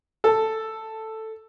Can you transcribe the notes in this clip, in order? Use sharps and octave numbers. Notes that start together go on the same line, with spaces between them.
A4